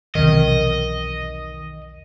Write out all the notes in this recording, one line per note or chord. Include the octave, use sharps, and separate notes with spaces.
B1 E2 C3 D#3 D#5